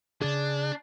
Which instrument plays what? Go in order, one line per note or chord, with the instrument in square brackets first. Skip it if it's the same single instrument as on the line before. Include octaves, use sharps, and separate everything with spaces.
[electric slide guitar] C#3 G#4 [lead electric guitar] D4